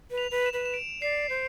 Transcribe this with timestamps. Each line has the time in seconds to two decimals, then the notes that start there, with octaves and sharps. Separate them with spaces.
0.11 B4
0.18 F7
0.31 B4
0.46 E7
0.53 B4
0.66 E7
0.74 D7
1.02 D5 C7
1.29 C5 C7